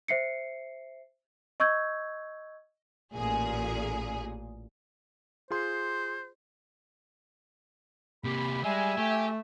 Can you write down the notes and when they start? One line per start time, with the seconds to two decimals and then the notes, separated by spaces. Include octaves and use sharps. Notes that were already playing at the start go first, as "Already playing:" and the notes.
0.08 C5 E5 C7 C#7
1.60 D#5 C#6 E6 G6 G#6
3.15 A1 A#2 G#4
5.51 F4 G#4 C5 C6
8.24 C3 A#3 G4 B5
8.64 G3 G#3 E5 G#5
8.98 A3 G4